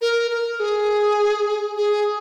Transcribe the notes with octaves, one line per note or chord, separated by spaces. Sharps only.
A#4
A#4
G#4
G#4